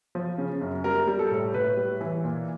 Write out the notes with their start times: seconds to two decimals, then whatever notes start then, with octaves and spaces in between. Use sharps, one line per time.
0.15 F3
0.38 C#3
0.61 F#2
0.84 G3 A#4
1.07 G3
1.19 A4
1.31 A2
1.54 A2 B4
1.77 G3
2.01 E3
2.24 A#2